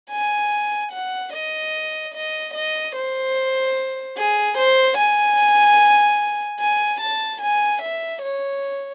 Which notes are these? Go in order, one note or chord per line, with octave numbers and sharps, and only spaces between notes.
G#5
F#5
D#5
D#5
D#5
C5
G#4
C5
G#5
G#5
A5
G#5
E5
C#5